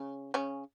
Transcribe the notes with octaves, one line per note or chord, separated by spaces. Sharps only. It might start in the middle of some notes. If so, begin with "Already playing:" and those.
Already playing: C#3 C#4
C#3 C#4